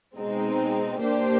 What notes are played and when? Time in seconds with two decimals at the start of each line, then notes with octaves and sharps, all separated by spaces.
0.17 B2 G#3 C4 D#4
1.00 A#3 D4 G4 C5